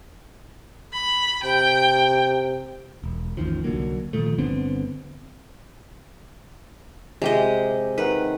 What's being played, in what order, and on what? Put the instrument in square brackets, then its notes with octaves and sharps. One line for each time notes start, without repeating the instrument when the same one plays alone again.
[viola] B5
[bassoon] C3 [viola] G5
[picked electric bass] E1
A1 E2 D#3 F3
C2 D3 F#3 A#3
A#2 D#3 F3 A3
G1 D3 B3 C4
[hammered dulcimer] C3 [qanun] G#3 G4 D#5
[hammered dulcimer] D#3 F#5 [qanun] B4